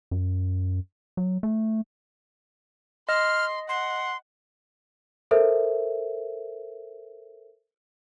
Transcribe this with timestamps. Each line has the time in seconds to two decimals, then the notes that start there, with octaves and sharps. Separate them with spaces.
0.11 F#2
1.17 F#3
1.43 A3
3.09 D#5 C6 F6
3.69 F#5 C6
5.31 A4 A#4 C5 E5